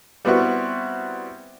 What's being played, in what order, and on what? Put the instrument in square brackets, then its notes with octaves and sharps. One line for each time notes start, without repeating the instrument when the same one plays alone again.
[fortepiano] G3 B3 C4 E4 F#4